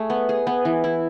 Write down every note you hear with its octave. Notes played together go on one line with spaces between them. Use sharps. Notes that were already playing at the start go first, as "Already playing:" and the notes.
Already playing: A3 G#4
B3
G#4
B3
E3
E4